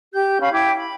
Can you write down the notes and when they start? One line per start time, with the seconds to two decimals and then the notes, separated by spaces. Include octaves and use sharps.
0.13 G4 G6
0.40 C#4 F5 B5
0.52 E4 G5 D6 G#6
0.77 B5